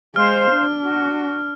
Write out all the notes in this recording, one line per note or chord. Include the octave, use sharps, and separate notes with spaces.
G#3 C5 F5 F6
D4
F#4